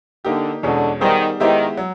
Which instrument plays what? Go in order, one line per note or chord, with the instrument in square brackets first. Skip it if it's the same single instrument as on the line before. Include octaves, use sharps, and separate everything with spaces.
[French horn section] D3 [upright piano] A#3 D#4 G4
[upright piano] E2 B2 G#3 C#4 [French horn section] D3
[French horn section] D#3 [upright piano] G3 B3 D#4 G#4 C5
[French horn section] D#3 [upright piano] G#3 B3 E4 G4 C5
[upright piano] F#3